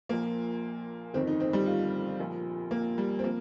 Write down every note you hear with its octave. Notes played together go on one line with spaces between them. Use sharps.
A#1 A#2 F3 A#3
G1 F2 D#3 C4
D#4
C4
G3
F4
A#1 A#2 F3
A#3
G3
C4
F3 A#3